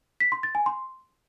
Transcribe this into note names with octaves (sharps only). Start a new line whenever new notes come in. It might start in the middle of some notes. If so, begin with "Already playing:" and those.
B6
C6
A6
G#5
C6